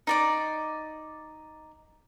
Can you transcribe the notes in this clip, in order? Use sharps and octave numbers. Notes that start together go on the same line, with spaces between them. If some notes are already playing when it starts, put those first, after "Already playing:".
D#4 D5 D6